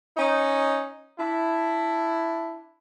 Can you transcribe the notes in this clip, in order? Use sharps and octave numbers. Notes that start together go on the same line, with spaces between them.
C#4 D#4
D4 E4